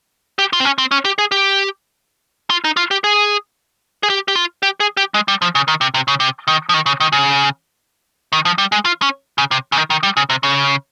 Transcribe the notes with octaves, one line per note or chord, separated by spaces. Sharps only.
G4
F4
C4
C#4
C4
C#4
G4
G#4
G4
F4
D#4
F4
G4
G#4
G#4
G4
G4
F4
G4
G#4
G4
G#3
G3
F3
C#3
D#3
C3
C3
C#3
C3
D#3
F3
D#3
C#3
D#3
C#3
D#3
F3
G3
G#3
F4
C#4
C#3
C3
C#3
D#3
D#3
G3
C#3
C3
C#3